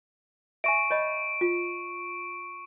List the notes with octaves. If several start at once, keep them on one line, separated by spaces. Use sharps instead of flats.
E5 G#5 C#6 D7
C#5 D#5 B5
F4